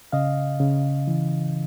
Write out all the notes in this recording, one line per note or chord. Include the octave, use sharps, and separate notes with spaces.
C#3 D#5 F5
C#3
E3